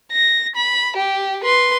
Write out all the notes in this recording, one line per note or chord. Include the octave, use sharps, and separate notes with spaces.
A#6
B5
G4
B4 C6